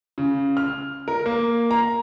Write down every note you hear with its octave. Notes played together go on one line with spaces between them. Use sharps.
C#3
F6
A#4
A#3
A#5